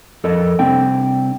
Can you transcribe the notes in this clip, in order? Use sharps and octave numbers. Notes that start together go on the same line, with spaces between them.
F2 A4 A#4 D#5
C2 C4 D4 G5